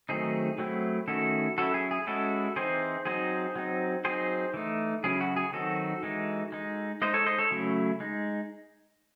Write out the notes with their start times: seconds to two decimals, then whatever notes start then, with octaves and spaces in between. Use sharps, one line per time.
0.09 D#3 F#3 A3 C4 D#4 G#4
0.58 F#3 A3 C4 E4
1.08 D#3 A3 C#4 E4 F#4 A4
1.58 F#3 C#4 E4 F#4 A4
1.74 G#4
1.91 G#4
2.07 G#3 C#4 E4 F#4 A4
2.56 E3 C4 D#4 G#4 C5
3.05 F#3 C4 D#4 G#4 C5
3.56 F#3 C4 D#4
4.04 F#3 C4 D#4 G#4 C5
4.54 E3 A3 D#4
5.04 C#3 F#3 C#4 E4 G#4
5.21 F#4
5.36 G#4
5.53 D#3 F#3 C4 D#4 F#4 A4
6.03 E3 G#3 D#4
6.52 G#3 D#4
7.02 G#3 D#4 C5 D#5
7.14 A4 C#5
7.26 C5 D#5
7.38 A4 C#5
7.51 C#3 F#3 A3 C#4 E4
8.00 G#3 D#4